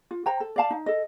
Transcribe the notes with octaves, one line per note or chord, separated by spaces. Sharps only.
F4
C5 G5 A#5
A4
D5 F5 A5
D#4
A4 D#5